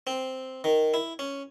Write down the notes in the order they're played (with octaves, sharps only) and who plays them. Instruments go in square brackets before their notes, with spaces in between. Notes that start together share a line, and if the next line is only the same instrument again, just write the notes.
[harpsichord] C4
D#3
E4
C#4